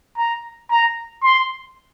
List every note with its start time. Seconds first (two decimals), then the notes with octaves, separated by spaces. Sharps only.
0.17 A#5
0.70 A#5
1.24 C6